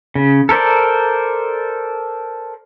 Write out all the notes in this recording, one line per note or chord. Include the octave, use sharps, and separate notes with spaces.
C#3
A4 A#4 C5 D5